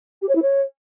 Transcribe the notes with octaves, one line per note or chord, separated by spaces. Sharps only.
G4
C#5
E4
C#5